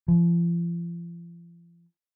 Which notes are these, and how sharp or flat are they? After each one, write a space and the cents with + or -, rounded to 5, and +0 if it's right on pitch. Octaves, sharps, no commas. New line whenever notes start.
F3 -40